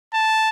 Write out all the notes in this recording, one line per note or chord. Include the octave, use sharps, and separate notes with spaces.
A5